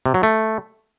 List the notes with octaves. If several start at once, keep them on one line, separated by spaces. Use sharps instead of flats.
C3
F#3
A3